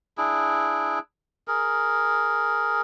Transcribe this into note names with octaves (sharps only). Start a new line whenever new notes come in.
D4 E4 G#4
G#4 A#4